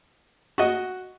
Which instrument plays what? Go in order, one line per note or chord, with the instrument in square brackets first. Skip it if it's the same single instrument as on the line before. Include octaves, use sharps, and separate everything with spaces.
[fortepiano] F#4 D#5